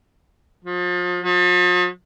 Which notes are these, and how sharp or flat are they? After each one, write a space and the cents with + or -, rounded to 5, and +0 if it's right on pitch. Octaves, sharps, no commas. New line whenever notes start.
F3 +35
F3 +45